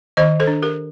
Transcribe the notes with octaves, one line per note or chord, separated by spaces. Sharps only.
D#3 C5 D#5
A4 C5
D4
G4 A#4